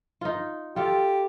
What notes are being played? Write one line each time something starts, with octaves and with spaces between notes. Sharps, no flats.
D#4 F4
F4 G4 A4